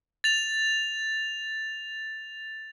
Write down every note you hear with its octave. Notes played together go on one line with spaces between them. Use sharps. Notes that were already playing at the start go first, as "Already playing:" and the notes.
A6 F7